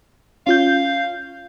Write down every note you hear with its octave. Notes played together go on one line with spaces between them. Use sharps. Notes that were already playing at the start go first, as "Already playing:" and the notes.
C#4 F4 F5 G6